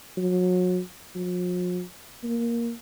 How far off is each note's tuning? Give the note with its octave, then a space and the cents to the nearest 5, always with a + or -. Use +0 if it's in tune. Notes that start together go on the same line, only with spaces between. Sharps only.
F#3 -30
F3 +45
A#3 +5